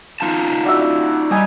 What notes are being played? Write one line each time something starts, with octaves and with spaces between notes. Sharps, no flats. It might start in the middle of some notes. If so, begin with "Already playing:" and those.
D#4 F4 A5
D4 F#4 E5
G3 D#4 G#5 D#6